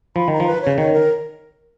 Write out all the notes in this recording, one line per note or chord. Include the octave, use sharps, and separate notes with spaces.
F3 B5
D#3 A#5
F3
B4
C#3 C#5
D#3 C#5
A#4